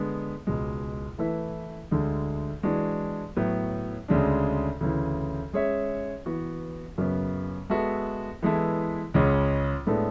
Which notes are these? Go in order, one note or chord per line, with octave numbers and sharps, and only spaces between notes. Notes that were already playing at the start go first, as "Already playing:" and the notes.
Already playing: D3 G#3 B3
C#2 B2 G#3
E3 A3 E4 B4 E5
D2 D3 G#3
E3 G#3 D4 F#4
A2 F#3 B3
D2 C#3 G#3 D4
D2 C#3 E3
G#3 C#4 G#4 C#5 E5
E3 B3 F#4
F#2 C#3 F#3 B3
G#3 B3 F#4 A4 E5
E3 G#3 B3 E4 A4
C#2 C#3 G#3 C#4
A2 G#3 B3 D4 A4